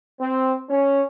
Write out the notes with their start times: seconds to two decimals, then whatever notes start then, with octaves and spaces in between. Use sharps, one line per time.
0.20 C4
0.70 C#4